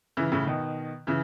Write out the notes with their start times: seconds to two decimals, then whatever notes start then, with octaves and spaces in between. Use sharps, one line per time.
0.17 C#3 E3
0.32 A2 C#3
0.47 B2 D#3
1.07 C#3 E3